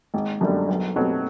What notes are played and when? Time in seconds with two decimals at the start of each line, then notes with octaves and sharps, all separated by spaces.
0.14 G#1
0.41 F#2 D3 G3
0.68 B1
0.96 B2 F#3 A3 C4